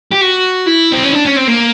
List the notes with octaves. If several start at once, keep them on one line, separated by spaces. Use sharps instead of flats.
G4
F#4
E4
C4
C#4
D4
C#4
C4
A#3